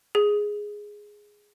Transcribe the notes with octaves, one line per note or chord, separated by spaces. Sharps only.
G#4